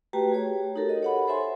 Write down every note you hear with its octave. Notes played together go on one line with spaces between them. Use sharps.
A3 F#4 G4 B4 G5 A#5
G#4 C#5
D#4 F#4 G4 A4 A#4
D#5
C#5 F#5 B5
A4 C5 E5 G#5 C6